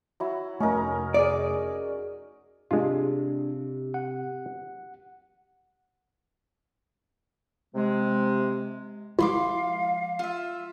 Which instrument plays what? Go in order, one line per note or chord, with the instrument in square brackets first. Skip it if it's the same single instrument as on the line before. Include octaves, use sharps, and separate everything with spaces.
[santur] F#3 E4
[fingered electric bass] F1 A3 [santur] C#4 D#4 A#4
[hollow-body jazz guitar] G#4 D5
[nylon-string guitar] C3 [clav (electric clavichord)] G#3 F4 [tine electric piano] D4
[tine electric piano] F#5
[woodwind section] C3 G#3
[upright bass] F3 G#3 [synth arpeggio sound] E4 [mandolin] E5 C6 D6 [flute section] F5
[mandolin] F4 E5